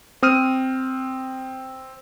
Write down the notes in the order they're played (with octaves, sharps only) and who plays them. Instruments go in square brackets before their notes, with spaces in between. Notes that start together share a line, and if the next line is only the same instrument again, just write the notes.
[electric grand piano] C4 D#6 F6 D#7